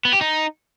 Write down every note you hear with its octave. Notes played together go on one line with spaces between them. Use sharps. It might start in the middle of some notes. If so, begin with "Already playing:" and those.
B3
G4
D#4